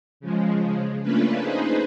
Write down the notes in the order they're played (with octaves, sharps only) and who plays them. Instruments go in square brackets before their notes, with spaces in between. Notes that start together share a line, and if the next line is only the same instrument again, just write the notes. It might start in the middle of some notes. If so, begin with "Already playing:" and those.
[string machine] C#3 F3 G#3
A3 A#3 C#4 D4 F4 B4
D#4 G#4 B4 C5